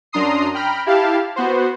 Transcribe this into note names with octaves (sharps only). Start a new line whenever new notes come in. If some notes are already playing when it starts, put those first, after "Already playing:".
F#2 D4 A#5 C6 D#6 C7
G5 A#5 B5 F6
E4 G4 F5 A5
B3 F#4 C5